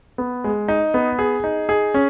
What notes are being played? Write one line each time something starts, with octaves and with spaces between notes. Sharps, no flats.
B3
G#3
D#4
B3
G#4
D#4
G#4
C#4